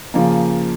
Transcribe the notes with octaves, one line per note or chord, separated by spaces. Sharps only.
C#3 F3 A#3